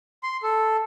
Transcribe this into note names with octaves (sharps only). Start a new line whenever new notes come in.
C6
A4